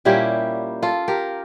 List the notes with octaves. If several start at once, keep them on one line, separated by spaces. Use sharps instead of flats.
A#2 G3 A#3 C#4 E4 G4
F4 A4
G4 A#4